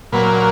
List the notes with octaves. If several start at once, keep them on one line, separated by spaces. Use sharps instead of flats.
A#2 F#3 A#3 B4